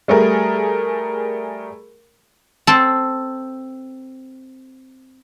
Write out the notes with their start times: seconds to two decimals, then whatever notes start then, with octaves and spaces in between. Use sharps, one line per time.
0.08 G3 A3 G#4 A#4
2.67 C4 A4